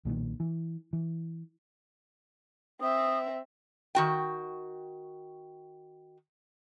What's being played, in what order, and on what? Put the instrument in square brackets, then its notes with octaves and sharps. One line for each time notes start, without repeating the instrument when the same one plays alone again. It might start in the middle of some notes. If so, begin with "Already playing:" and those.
[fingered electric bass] B1 A#2 D3 D#3
E3
E3
[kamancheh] C4 E5 [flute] D#6
[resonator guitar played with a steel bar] D#3 F#4 G5